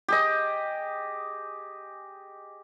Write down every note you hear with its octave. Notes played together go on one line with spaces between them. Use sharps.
G4 G#4 D#5